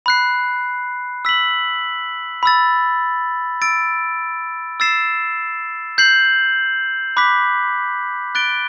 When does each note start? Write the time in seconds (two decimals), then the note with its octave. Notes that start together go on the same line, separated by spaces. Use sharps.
0.06 B5 F#6 C7
1.25 E6 B6 F#7
2.43 B5 E6 A6
3.62 E6 A6 D7
4.80 E6 A6 C7 E7
5.98 G6 C7 F#7
7.17 B5 D6 F#6 B6
8.35 F#6 A6 D7 G7